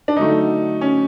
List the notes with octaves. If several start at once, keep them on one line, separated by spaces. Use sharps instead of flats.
D4
D3 F#3 A3 D#4
C#4